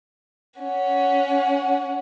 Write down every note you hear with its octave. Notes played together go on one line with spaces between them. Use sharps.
C#4 F#5